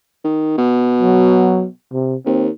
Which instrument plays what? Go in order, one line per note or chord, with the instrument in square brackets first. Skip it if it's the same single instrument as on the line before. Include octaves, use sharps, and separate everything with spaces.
[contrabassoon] D#3
B2
[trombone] F#3
C3
[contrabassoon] D#2 [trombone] C4